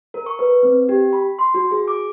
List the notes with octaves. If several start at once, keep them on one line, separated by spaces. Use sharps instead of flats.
A#4
C#6
B4
C4
G4
B5
C6
F#4
G#4
D6